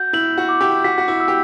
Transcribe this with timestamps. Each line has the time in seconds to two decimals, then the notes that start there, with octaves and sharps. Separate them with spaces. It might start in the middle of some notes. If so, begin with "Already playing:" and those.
Already playing: F#4 G6
0.13 E4 F#7
0.38 F#4
0.49 D6
0.61 E4 G4
0.84 F#4 B6
0.98 F#4
1.08 E4
1.20 E6
1.28 G4